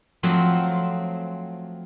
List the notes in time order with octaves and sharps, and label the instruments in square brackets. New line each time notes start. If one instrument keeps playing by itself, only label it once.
[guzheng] F3 F#3 A3 C4